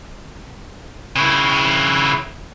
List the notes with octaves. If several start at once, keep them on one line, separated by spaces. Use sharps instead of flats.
C#3 E4